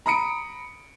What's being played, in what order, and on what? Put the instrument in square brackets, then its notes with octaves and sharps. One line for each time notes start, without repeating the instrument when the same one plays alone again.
[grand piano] A#5 B5 D#6 C#7 D7